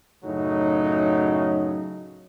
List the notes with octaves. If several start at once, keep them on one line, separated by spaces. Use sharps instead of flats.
F#2 A2 C#3 F#3 D#4